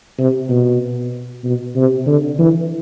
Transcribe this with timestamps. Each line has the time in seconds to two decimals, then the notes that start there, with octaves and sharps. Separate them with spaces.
0.19 C3
0.49 B2
1.44 B2
1.76 C3
2.07 D3
2.39 E3